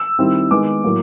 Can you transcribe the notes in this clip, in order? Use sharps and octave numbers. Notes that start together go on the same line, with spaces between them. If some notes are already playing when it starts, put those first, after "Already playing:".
Already playing: E6
D#3 G3 C4 E4
D#3 G#3 B3 D6
A2 F#3 A#3